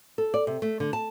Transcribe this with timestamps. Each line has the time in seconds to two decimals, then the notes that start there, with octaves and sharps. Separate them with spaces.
0.18 A4
0.34 D5
0.47 C3
0.62 A3
0.80 D3
0.93 A5